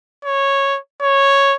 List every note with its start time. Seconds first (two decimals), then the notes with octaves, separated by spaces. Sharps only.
0.25 C#5
1.02 C#5